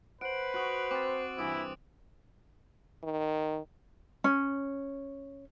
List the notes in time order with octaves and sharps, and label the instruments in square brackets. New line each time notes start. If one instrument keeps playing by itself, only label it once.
[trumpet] B4 [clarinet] C5 [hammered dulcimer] F#5 [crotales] D7 F#7
[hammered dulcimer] F#4 [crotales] D#6 F#6 F#7
[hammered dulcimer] C4 [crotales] D6 A6
[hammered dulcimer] G2 E3 [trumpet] E4 [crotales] D#6 D7
[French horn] D#3
[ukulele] C#4